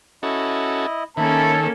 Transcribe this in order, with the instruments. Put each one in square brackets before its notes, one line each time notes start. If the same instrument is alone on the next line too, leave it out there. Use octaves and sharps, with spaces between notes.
[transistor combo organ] C#4 F#4 A4 [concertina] E4 D#5
[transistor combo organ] D#3 [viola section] A#3 C#4 A4 [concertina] E5 B5 [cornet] A5